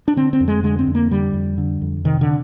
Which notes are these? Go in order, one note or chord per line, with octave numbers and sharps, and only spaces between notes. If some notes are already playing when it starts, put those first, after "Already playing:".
D4
D3 C4
C4
F2
G#3
D3 G#3
C4
F2
A#3
D3 G3
F2
D3
F2
C3 D#3
D3